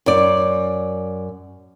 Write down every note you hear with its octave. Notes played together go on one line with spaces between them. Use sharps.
F#2 D5